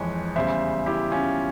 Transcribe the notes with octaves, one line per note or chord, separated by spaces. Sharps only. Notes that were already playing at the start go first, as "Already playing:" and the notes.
Already playing: F2 E3 G#3 C#5
E2 C#3 G3 C5 E5
E4 G4
C#4 F4